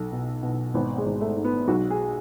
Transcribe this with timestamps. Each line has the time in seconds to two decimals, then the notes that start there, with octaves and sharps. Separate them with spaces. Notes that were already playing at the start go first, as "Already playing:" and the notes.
Already playing: B1 A4
0.12 B2
0.43 B2
0.74 G#1 B3
0.98 G#3
1.06 G#1
1.21 A3
1.36 G#2
1.44 B3
1.68 B1 F#4
1.90 G#4